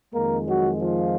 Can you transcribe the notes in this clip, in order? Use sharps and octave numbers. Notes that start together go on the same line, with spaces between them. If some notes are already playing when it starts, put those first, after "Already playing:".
F2 D#3 G#3 A#3 A#4
F#3 F#4
F3 F4